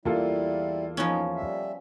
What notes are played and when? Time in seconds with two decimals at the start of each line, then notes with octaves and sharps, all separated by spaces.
0.05 E2 G3 A#3 E4 F4 A4
0.97 F3 B3 C#4 D#4
1.36 G3 E5